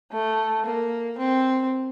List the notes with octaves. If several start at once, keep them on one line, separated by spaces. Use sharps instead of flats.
A3
A#3
C4